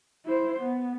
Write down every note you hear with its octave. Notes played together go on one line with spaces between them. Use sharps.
E4 C5
B3